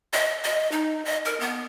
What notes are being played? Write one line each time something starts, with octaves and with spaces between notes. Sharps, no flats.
D#5
D#5
D#4
D#5
A#4
B3